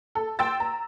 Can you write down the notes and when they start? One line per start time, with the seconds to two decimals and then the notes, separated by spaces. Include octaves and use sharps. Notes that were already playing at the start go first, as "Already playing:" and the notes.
0.15 A4
0.39 G5 C6 E6 A6
0.60 A#5